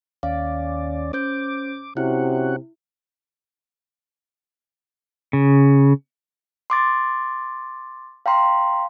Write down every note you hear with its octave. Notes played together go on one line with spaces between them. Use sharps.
D#2 C#4 D5 F5
C#4 C5 D6 G6
C3 C#4 E4 F#4 F#5
C#3
C6 D6 A6
F5 G5 A#5 C6